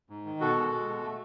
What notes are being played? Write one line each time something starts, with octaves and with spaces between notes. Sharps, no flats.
G#2
D#3
B2 F#4 A4
G#3
G#3
B2
A3